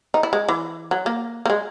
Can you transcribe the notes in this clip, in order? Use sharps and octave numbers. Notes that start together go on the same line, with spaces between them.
D#4
E4
G#3
E3
F#3
A#3
A#3
G#3